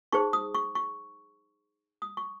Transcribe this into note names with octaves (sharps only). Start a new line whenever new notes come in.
D#4 G#4 C5 C#6
D#6
C#6
C#6
D#6
C#6